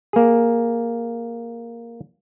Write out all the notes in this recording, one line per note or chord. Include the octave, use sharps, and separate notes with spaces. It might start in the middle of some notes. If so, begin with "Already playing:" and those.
A#3 G#4